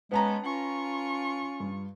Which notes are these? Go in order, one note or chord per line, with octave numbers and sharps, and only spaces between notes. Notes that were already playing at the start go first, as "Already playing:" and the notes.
G#3 B3 C#4 B4 A5 A#5
C#4 F4 C#6
G2